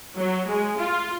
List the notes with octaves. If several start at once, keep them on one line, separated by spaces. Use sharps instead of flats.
F#3
G#3
F4